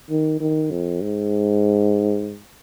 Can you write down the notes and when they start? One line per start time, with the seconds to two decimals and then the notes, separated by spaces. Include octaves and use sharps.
0.11 D#3
0.41 D#3
0.71 F2
1.02 G#2